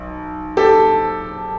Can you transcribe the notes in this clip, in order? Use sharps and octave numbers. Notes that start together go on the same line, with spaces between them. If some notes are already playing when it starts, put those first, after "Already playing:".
Already playing: B1
G4 A4